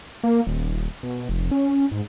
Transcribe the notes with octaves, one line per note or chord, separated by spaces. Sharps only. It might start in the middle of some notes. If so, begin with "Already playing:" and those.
A#3
D#1
B2
F1
C#4
G#2